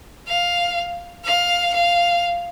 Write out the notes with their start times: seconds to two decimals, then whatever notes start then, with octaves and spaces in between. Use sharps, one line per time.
0.27 F5
1.24 F5
1.74 F5